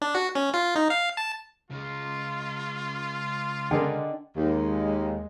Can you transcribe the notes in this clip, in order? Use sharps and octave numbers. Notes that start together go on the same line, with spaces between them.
D4
F#4
C#4
F4
D#4
F5
A5
C#3 G#3 F4
D3 D4 G#4 A#4 D#5 G5
D#2 G#3